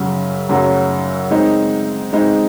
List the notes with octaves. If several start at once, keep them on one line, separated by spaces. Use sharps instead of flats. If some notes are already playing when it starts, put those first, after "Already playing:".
Already playing: F#2 C#3 F#3
F#2 C#3 F#3
G#3 C4 D#4
G#3 C4 D#4